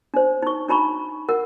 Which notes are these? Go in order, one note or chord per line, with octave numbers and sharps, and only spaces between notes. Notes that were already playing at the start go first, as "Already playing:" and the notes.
D4 C5
D#4 C#6
D4 D#4 A#5 B5 C#6
A#4 F#5